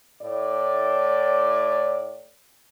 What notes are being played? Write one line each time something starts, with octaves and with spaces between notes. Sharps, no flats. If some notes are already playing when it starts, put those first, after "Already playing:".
A2 D5